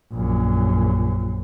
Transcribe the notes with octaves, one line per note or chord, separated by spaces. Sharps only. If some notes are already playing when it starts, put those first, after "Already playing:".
A#1 F#2